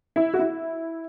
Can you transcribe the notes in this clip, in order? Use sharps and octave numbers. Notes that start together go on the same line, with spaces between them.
E4
F#4
E4